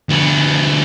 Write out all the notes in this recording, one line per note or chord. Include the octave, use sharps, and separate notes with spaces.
D2 B3